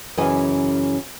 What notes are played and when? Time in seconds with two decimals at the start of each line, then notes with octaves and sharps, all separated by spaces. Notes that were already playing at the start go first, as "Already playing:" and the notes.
0.17 F#2 C#3 E3 D#5 G#5